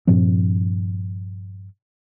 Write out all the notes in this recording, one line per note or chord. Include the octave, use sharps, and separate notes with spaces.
G2 A#2 F3 C4